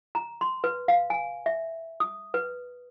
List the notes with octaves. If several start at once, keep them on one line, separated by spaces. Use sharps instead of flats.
A#5
C6
B4
F5
G#5
E5
D#6
B4